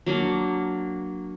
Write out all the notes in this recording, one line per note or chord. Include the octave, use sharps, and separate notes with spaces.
F#3 A#3 D4